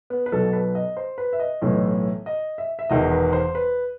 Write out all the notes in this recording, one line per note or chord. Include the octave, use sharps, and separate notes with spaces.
B3
B4
B1 B2 A4
B4
D#5
C5
B4
E5
D#5
B1 A2 E3
D#5
E5
E5
E1 E2 D#3 D#5
B4
C5
B4